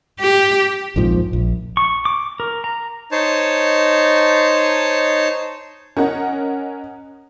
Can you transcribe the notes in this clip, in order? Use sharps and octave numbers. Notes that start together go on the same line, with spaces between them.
G4
A#1 F2 G#2 F3
A#1
C#6
D6
A#4
A#5
D#4 C5 C#5 A5
C#4 A#4 D#5 F#5